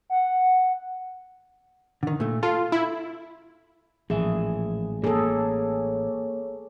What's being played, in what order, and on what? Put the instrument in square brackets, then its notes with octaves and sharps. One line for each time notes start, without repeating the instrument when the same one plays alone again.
[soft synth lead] F#5
[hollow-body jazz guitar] D3 D#3
A#2 A3
[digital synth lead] F4 [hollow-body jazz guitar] A4
[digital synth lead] E4
[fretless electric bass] A1 A#2 [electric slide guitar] F3 E5 [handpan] G#4
[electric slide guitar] A#3 [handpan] G#4 A4 [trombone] C#5